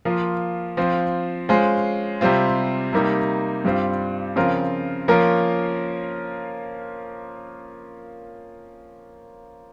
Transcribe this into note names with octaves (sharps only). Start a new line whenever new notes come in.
F3 A#3 F4
F3 C4 F4
G#3 C#4 F4 C5
C3 G3 C4 F4
C3 G3 A#3 D#4
G2 G3 C4 F4
C#3 F3 C4 F4 A#4
F3 A#3 C#4 F4 A#4